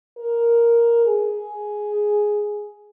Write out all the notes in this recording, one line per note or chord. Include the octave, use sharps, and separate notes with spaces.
A#4
G#4